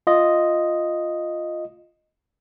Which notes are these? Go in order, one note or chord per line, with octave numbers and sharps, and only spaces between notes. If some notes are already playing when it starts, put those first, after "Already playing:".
F4 D#5